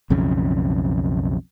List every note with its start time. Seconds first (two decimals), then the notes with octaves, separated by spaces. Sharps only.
0.10 B1 F2 C#3